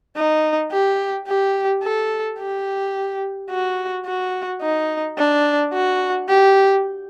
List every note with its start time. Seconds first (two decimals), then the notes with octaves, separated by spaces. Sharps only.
0.16 D#4
0.72 G4
1.28 G4
1.83 A4
2.39 G4
3.50 F#4
4.06 F#4
4.61 D#4
5.18 D4
5.73 F#4
6.29 G4